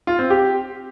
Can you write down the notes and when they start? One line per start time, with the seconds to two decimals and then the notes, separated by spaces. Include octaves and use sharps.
0.07 F4
0.19 C4
0.30 G4